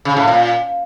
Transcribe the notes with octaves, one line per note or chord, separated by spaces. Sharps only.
C#3
A2
A#2